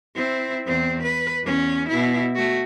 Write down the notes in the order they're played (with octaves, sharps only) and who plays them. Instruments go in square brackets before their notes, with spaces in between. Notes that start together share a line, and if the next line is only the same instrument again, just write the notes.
[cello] C4 E4
E2 C4
B4
E2 C#4
B2 E4
A3 F#4